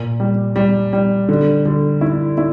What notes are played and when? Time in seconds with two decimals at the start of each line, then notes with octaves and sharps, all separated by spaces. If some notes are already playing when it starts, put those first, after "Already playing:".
Already playing: A#2
0.20 G3
0.56 G3
0.93 G3
1.29 D3
1.65 D3
2.01 E4
2.38 E4